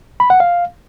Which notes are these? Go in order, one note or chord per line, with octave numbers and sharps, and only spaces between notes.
B5
F#5
F5